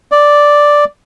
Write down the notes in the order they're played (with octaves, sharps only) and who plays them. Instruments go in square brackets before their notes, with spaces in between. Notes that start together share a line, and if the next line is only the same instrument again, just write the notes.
[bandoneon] D5